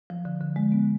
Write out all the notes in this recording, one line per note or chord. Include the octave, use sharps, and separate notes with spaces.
F3
D3
D3
G#3
B3